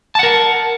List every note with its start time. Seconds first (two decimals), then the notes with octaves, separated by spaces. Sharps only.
0.15 A5
0.19 F#5
0.23 A#4